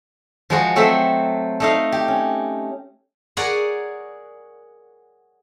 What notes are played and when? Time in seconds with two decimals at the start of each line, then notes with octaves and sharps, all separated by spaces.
0.50 F3 G#3 F#4
0.76 F#3 A3 C4 C5 E5
1.60 A3 D#4 F5
1.92 G4
2.08 C#4
3.37 G#4 A#4 C#5 D5 F#5 G#5